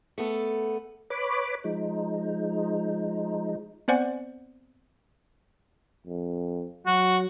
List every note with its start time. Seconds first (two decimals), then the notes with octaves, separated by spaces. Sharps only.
0.18 A3 B3 A4
1.10 B4 C#5 B5 D6
1.64 F3 G#3 D#4
3.88 B3 C4 C5 D5 F#5 G#5
6.07 F2
6.86 F#3 F#4